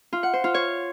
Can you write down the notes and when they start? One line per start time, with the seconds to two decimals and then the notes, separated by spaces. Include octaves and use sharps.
0.13 F4
0.23 F#5
0.34 C5
0.44 F4
0.54 C#5